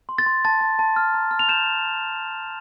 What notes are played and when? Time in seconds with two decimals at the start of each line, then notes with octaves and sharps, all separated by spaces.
0.09 C6
0.18 A6
0.26 C6
0.45 A5 A6
0.61 A5
0.79 A5
0.96 F6
1.14 A#5
1.31 F6
1.39 F7
1.48 G6 E7